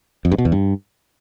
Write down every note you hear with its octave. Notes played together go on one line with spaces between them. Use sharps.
F2
G2
B2
E2
G2